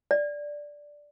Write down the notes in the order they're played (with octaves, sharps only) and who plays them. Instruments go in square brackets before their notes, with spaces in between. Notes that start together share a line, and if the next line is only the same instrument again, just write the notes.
[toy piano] D5